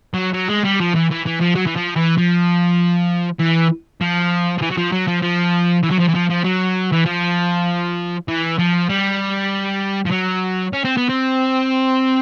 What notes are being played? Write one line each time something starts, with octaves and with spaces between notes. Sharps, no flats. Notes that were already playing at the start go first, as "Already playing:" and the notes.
F#3
F#3
G#3
G3
F3
E3
E3
E3
F3
F#3
E3
F3
E3
F3
E3
F3
F3
E3
F#3
F3
F#3
F3
F3
E3
F#3
F3
E3
F3
F3
F#3
E3
F3
E3
F3
G3
F3
F#3
C#4
C4
B3
C4